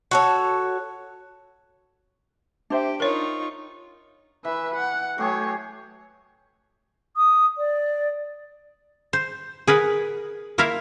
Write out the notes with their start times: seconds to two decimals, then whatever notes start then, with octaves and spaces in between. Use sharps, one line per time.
0.11 F#4 A4 C#5
2.70 D4 G4 C5 E5
3.00 D#4 F4 A#4 C#5 C#6
4.45 E3 B4 E5
4.75 F#5
5.18 F#3 A3 G4 G#4 C#5
7.17 D#6
7.58 D5
9.13 C5
9.67 G#4 A#4 B4 F#5
10.58 A#3 E4 F4 A#4 E5 F5